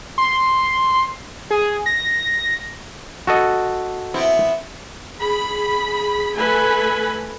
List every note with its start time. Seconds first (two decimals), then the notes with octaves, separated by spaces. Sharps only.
0.18 C6
1.51 G#4
1.86 A#6
3.27 F#4 A4 D#5
4.14 B3 C4 E4
5.18 G#4 B5
6.34 A3 A4 B4 G#5 B5